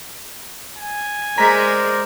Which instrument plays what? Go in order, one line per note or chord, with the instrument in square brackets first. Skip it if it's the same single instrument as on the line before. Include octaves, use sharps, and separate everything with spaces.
[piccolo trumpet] G#5
[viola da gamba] G#3 [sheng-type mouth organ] A#4 C5 D5 [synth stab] A#5 B6